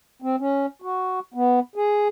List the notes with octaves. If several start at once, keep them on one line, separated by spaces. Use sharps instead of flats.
C4
C#4
F#4
B3
G#4